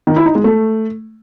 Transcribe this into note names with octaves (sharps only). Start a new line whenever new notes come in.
D#3
E4
D#4
G#3
A3